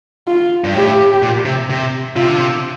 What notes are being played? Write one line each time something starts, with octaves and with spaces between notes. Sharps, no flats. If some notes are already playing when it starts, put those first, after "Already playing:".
F4
G2
A2 G4
A#2
C3
C3
C3 F4
D3
C3